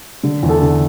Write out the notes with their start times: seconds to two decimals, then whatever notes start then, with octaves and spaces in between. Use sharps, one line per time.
0.23 D3
0.43 E2
0.49 A4
0.62 D3